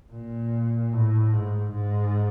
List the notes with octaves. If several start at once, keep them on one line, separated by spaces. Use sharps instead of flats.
A#2
A2
G#2
G#2